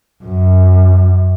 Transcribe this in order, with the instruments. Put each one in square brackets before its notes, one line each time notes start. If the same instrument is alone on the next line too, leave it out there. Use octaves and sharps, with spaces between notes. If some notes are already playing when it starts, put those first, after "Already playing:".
[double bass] F#2